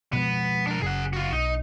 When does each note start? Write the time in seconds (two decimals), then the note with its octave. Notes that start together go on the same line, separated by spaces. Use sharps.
0.13 B2 F3 G#3 B3
0.67 D4 A#4
0.82 F#1 F#2 C#3 G#4 F#5
1.13 F4 F#4
1.33 B1 D#4